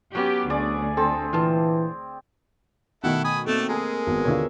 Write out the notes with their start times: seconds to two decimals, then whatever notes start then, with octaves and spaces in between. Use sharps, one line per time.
0.15 F#3 B3 C#4 G4
0.50 D2 G#4 D5
0.97 C4 A4
1.33 A#2 E3 F4 A5
3.04 B2 D#3 A3 E4 A4 F#5
3.25 G#5 B5 D#6
3.47 A3 A#3 C4 D4 A4 A5
3.69 G#3 G#4 A#4
4.07 G#1 B3 F#4
4.25 D#2 D3 F4 C#5 E5